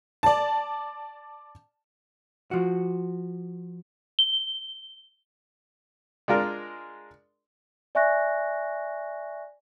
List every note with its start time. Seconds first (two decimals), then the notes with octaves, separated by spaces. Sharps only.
0.23 D5 A5
2.51 F3 F#4
4.19 G7
6.28 G#3 D4 F4 A#4
7.95 D5 E5 G#5 C#6 F#6 A#6